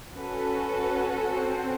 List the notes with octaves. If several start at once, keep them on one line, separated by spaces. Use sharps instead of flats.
C#4 F#4 A4 B4
C4 C5